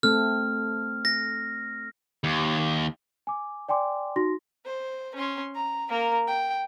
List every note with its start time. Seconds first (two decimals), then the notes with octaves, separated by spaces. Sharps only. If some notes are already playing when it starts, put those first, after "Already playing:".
0.03 A3 C4 A4 F6
1.05 A#6
2.24 D#2
3.27 G#5 D6
3.69 D5 G5 G#5 C6 D6
4.16 D#4 F#4 C6 A#6
4.65 C5
5.16 C#4 C6
5.55 A#5
5.89 A#3 A#4
6.27 G5